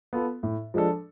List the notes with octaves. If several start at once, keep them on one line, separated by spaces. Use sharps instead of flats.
B3 F4 A4
A2
F3 G#3 D4 A4